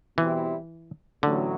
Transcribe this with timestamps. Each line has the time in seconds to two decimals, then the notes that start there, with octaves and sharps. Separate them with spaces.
0.18 B2 E3 G3 C4 E4 G4
1.23 A1 A2 D3 F#3